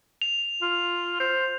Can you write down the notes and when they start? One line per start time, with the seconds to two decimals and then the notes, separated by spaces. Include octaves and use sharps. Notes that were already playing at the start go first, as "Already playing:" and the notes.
0.22 F7
0.62 F4
1.20 C5